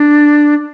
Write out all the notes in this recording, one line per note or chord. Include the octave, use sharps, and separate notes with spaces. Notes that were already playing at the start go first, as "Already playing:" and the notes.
Already playing: D4